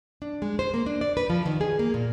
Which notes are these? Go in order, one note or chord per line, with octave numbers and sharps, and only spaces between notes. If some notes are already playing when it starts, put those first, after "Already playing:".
D4
G#3
C5
A#3
D4
D5
B4
F3
D#3
G#4
A#3
A#2